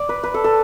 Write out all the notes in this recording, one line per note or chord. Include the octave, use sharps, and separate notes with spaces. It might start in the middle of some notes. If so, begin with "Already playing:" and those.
Already playing: D5
B4
B4
A4
A4